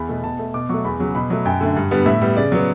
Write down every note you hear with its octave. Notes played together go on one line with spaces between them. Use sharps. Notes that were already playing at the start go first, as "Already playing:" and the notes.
Already playing: E2 B5
B2 A3
B2 A5
A3
B2 D6
F#3 A3 C#6
E2 B5
C#3 F#3
B2 B5
F#3 A3
F#2 G5
D3 A3
G2
D3 G3 B3
A2 E5
G3 B3
C#3 D5
F#3 B3